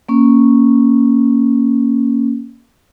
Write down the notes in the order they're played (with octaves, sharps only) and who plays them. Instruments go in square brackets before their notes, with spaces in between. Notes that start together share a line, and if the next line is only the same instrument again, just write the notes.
[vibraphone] A#3 C#4